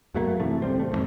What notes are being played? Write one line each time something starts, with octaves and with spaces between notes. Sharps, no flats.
F#2 F#3 A3 A#3
C3 E3 A3
G#1 C3 G3 C4
A3
A1 F2 G#2